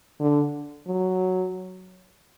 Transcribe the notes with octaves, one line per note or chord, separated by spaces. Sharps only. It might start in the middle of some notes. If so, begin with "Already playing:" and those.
D3
F#3